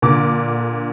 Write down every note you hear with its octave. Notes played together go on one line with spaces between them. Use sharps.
A#2 D3 D6